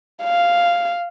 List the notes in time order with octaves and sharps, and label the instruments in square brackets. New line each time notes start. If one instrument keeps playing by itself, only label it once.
[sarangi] F5